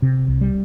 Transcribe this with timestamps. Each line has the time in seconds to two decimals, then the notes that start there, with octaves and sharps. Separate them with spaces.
0.02 C3
0.28 C2
0.41 G3